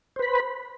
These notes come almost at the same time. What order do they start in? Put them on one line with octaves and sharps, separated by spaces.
C5 B4 B5